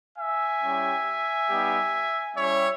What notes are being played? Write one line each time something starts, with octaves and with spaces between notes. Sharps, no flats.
E5 G#5
G3 C#4 E4 G4
G3 B3 D#4 G4
G3 C#4 E4 G4 C#5 E5